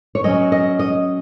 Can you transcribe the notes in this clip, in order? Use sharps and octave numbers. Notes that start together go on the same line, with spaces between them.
C#5
F#3 C#4 D#5
D#5
D#5